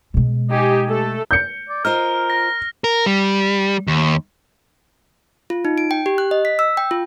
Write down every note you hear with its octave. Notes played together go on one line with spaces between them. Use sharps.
B2 G#3
D#4 G4 G#5
A3 A4
G6 C#7
D5
F4 A#4 C5 D#5 F6
A#6
A#4
G3
D#2
F4
D#4
D7
G5
G4
F#6
D#5
B6
E6
G5
F4